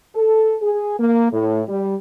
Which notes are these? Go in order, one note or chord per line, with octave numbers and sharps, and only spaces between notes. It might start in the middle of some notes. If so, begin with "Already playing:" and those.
A4
G#4
A#3
A2
G3